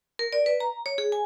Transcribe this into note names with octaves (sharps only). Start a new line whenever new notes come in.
A#4
D5
B4
A#5
C#5
G#4
G#5